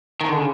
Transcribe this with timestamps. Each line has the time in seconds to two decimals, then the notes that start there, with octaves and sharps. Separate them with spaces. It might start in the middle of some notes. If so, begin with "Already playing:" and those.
0.21 D#3
0.28 D3
0.36 C#3